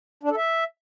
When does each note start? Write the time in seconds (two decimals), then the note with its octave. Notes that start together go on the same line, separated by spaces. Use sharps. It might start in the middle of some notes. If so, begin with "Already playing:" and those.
0.23 D4
0.30 A4
0.37 E5